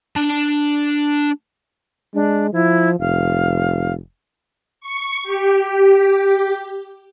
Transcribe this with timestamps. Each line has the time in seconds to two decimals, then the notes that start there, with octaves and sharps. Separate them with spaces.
0.16 D4 A5
2.14 G#3 D4
2.53 F3 E4
3.00 F1 F5
4.81 C#6
5.23 G4